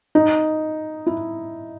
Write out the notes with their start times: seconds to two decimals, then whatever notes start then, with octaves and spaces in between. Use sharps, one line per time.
0.15 D#4
1.07 E4